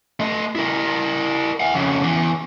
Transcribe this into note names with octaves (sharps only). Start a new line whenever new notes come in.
A3 D#5
E4 A#4
E5 F#5
F2 C#3
E2 E3